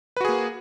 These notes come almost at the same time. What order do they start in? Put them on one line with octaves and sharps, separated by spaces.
B4 F#4 G#4 A#3